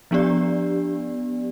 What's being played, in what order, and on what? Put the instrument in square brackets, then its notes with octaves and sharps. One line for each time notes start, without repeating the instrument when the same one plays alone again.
[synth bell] F3 B3 D4 G4 D5